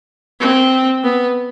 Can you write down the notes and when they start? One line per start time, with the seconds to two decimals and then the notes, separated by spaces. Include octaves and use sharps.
0.41 C4
1.03 B3